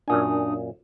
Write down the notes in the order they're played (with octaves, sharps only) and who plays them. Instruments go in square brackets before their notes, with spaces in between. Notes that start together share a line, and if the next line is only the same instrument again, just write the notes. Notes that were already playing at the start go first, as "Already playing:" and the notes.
[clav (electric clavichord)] F#2 A#2 G#5 [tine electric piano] D4 D#6